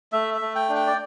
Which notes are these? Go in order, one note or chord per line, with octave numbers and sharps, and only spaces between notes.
A3 E5
E5
A3
G5
D4
G5
D5